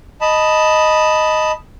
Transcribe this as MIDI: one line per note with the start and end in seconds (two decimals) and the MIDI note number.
0.21 1.52 75
0.21 1.52 81
0.21 1.52 83